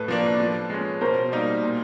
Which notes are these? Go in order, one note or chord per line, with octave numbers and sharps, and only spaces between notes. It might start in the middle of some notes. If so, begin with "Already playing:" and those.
Already playing: A2 A4 B4
F3 A#3 D4
F3
G#3 C#4
B2 A#4 C5
G3 A#3 D#4
A#2